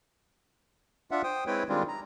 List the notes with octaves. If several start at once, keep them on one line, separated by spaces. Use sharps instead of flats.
D4 F4 E5 F#5
C5 G5 D#6
G#3 C4 E4 B4 C#5 G5
D#3 G3 G#3 C4 D4 F4
A#5